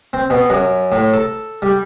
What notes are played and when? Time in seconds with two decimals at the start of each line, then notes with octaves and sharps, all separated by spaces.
0.13 C4
0.30 B2
0.50 F#2
0.92 A2
1.13 A4
1.62 G3